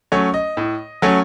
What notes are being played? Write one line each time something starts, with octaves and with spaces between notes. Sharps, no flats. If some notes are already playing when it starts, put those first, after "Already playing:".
F#3 A3 C#4 C#5
D#5
A2
F#3 A3 C#4